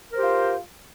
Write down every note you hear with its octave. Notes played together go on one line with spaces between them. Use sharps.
F4 G4 A#4 C5